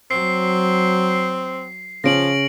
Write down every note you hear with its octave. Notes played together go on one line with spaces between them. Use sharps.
F#3 C4 C7
C#3 F3 C#4 A#6 D7 F#7